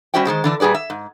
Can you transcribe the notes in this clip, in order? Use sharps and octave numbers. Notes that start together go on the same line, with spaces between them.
G3 C#4 F#4 C5 E5 G5
D#3 G3 G#3 C5
D3 E3 D4
A#2 G3 G#4 B4 D5
E5
G#2